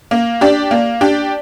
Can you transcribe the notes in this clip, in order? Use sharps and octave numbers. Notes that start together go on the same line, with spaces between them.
A#3
D4 G4 D5
A#3
D4 G4 D5